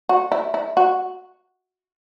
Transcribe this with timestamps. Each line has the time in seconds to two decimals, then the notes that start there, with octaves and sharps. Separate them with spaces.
0.09 F#4
0.32 E4
0.54 E4
0.77 F#4